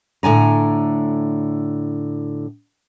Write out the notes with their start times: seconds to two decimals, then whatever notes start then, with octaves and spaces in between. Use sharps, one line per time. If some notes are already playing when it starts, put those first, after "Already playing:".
0.23 A2 D3 G#5 A#5